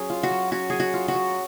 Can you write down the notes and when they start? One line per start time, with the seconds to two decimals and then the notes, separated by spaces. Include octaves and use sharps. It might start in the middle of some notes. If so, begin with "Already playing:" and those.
Already playing: F#3 C#4 G#4
0.10 F4
0.23 F#4
0.31 F#3
0.52 C#4 F#4
0.70 F#3 G#4
0.80 F#4
0.94 F4
1.08 F#4
1.15 F#3